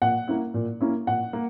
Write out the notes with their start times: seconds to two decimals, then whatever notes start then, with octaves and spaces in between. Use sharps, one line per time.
0.02 A#2 F#5
0.28 A#3 C#4 E4
0.54 A#2
0.81 A#3 C#4 E4
1.07 A#2 F#5
1.33 A#3